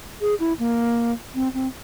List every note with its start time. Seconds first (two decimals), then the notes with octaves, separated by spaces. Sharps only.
0.21 G#4
0.40 E4
0.59 A#3
1.35 C4
1.54 C4